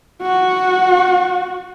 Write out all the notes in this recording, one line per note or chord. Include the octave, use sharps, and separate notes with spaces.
F#4